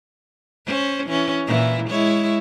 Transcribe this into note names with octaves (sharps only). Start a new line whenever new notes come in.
C#4 C5
E3 C#4
A#2 E3 E4
G#3 E4 C#5